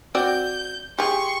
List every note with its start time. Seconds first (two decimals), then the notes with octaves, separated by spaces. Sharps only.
0.15 C4 F#4 D5 G6
0.98 G4 G#4 C6 C#6